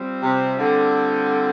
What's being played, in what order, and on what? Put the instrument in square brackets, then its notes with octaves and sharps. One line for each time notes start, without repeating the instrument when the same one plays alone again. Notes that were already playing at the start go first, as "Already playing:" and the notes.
Already playing: [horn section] G3 C4 F4
[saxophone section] C3
D3